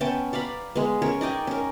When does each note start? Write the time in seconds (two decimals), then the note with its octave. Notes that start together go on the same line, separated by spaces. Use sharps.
0.01 B3 C#4 G5 A5
0.33 D5 F5 A#5 B5
0.75 G#3 B3
1.02 C#4 A#4 C#5
1.21 D#4 D5 G5 G#5
1.47 C#4 A#4